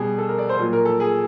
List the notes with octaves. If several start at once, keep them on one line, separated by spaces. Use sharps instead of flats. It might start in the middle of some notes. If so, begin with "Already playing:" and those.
Already playing: B2 G3 G#4
A4
A#4
D5
C5
A#2 F#3
A#4
A4
G#4